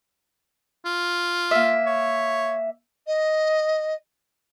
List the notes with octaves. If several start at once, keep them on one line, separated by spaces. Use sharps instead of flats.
F4
A#3 E5
C#5
D#5